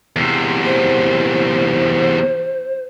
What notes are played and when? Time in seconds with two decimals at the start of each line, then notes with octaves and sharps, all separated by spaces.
0.16 E2 C3
0.65 C5